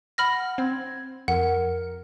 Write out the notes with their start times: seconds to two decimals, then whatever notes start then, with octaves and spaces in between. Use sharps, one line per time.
0.18 F#5 B5 F6 A#6
0.58 C4 G#6
1.28 F2 A#4 F#5